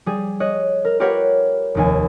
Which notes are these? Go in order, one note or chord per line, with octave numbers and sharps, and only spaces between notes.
G3 G#4
C#5 D#5 F#6
A#4
F4 G4 A#4 B4 C#5 F#5
F1 D#2 G#5